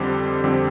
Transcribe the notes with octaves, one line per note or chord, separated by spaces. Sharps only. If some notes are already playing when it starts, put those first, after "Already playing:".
Already playing: F2 D3 G3 C4 G4
F2 D3 G3 C4